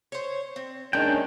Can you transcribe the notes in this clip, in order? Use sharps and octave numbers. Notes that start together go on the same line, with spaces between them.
C5 C#5
C4
A#2 D#3 G#3 C#4 D4 A4 G5 A#5